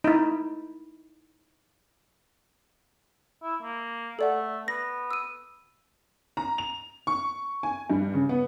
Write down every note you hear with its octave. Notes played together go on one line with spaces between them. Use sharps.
D#4 E4
E4
A#3
A3 A4 D5 F#5
B3 A#6
E6 D#7
A#5
F7
C#6
G#5
G2
C#3
B3